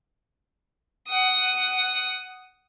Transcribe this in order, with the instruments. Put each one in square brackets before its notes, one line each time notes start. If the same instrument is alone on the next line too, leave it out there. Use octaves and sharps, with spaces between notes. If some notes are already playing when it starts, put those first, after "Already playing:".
[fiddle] F#5 D#6